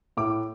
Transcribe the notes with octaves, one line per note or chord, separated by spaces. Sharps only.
A2 D6